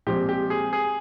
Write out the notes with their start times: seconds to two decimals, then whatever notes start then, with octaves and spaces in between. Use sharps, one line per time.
0.07 A#2 F3 G#3 C4 G4
0.29 G4
0.50 G#4
0.73 G#4